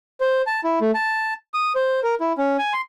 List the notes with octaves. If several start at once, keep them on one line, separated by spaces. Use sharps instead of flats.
C5
A5
E4
A3
A5
D#6
C5
A#4
E4
C#4
G#5
C6